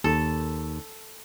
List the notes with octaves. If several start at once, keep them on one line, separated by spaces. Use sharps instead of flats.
D#2 A4